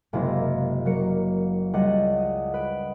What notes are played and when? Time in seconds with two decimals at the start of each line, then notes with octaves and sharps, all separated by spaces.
0.13 F#1 C3 G#3 A#3 E4 A#6
0.85 F#3 A#3 A#4 C#7
1.73 C#2 G3 D#5 F#5 A6 A#6
2.18 D#6
2.54 B4 D7